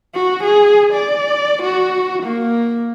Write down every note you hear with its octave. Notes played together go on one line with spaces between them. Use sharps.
F#4
G#4
D5
F#4
A#3